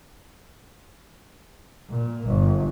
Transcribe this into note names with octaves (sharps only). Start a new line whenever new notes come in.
A#2
G1